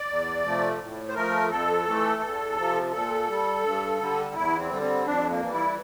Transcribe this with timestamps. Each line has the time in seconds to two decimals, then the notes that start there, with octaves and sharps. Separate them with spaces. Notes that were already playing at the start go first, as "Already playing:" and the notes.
Already playing: D5
0.08 E2
0.44 C3 F3 A3
0.79 A2
1.09 C5
1.15 F3 A3 A#4
1.50 F2 A4
1.86 E3 A3
2.22 E2
2.57 C3 F3
2.93 A#2 A4
3.28 G3
3.64 G2
3.99 D3 G3
4.35 E2 E4
4.58 C4
4.71 D3 G3
4.82 C4
5.06 F2 D4
5.30 A#3
5.42 E3 G3
5.53 E4